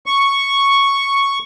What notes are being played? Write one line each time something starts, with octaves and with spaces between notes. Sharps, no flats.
C#6